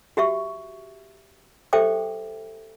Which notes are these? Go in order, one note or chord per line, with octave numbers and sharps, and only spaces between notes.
F#4 G4 E5 C#6
G4 A4 C5 E5 G5 D6